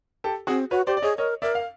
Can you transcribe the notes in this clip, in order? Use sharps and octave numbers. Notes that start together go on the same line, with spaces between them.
G4 A4
C4 F#4 G#4
F#4 B4 C#5
G4 C5 D5
D5
G#4 C#5 D#5
A#4 C#5 D#5
A#4 D5 E5
F5